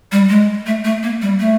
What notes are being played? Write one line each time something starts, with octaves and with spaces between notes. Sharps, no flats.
G3
G#3
A3
A3
A#3
G3
A3